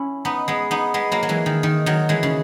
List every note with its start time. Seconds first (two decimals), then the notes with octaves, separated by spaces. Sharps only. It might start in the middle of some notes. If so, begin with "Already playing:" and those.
Already playing: C#4 E4
0.25 B3 D#4
0.48 G#3 B3
0.71 B3 D#4
0.94 G#3 B3
1.12 F#3 A#3
1.23 F#3
1.29 E3 G#3
1.46 D#3
1.63 D#3
1.86 D#3 F#3
2.09 E3 G#3
2.23 C#3